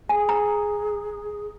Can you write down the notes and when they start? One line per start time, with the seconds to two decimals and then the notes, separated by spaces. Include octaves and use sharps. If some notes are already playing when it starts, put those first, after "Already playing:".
0.09 G#4 G#5
0.29 A#5